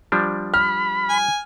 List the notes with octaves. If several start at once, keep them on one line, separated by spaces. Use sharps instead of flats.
F3 G3 D4
B5 F6
G#5